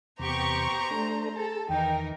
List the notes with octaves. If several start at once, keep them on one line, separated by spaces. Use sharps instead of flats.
E2 C3 B3 G4 C5 A#5 C#6
A3 D4 A4
G#4 A4 A5
E2 D#3 E3 D#4 A#4 G5